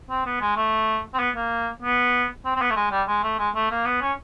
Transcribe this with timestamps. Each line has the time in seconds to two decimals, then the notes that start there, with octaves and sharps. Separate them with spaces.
0.10 C4
0.26 B3
0.41 G#3
0.57 A3
1.14 C4
1.19 B3
1.36 A#3
1.83 B3
2.45 C4
2.56 C4
2.61 B3
2.70 A3
2.76 G#3
2.91 G3
3.08 G#3
3.24 A3
3.39 G#3
3.55 A3
3.71 A#3
3.86 B3
4.02 C#4